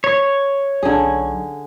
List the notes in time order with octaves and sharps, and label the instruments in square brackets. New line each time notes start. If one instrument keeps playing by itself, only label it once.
[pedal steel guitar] C#5
[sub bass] B1 [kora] D3 G#4